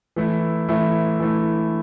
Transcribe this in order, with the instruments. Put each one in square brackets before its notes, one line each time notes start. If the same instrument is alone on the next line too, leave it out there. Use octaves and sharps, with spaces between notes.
[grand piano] E3 A3 E4
E3 A3 E4
E3 A3 E4